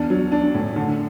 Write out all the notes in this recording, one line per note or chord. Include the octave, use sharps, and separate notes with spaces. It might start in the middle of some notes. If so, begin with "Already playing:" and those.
Already playing: E2 D4
F#3
D4
A2
D3